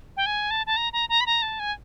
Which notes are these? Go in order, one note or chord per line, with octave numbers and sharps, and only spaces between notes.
G5
G#5
A5
A5
A#5
A#5
A#5
B5
A#5
A5
G#5